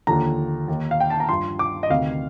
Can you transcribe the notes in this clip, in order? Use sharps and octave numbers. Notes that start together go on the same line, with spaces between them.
D#2 D3 F3 A#5
D#2 D#3
F5
G5
A5
A#5
G2 F3 C6
D6
D#5
D2 C3 D#3 F5